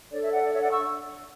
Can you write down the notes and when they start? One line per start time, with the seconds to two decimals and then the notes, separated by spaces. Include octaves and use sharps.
0.10 D4 A4 C#5 D5
0.22 C#5 E5
0.33 D5 F#5
0.44 D5
0.52 C#5 E5
0.61 D5 F#5
0.70 C#6 E6